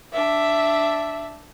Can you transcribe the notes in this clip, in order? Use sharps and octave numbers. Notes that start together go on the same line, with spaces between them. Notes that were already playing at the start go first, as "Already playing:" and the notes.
D4 E5